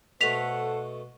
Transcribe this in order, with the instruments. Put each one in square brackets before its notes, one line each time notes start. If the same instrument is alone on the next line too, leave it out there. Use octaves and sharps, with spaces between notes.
[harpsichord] B2 A3 [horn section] A4 C5 F#5 [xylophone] B6 F7